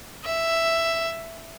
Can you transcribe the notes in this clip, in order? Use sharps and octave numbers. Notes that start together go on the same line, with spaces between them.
E5